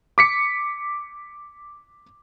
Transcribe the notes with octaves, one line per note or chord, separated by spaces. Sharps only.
D6 B6 C#7